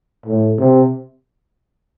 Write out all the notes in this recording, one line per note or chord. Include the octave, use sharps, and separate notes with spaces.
A2
C3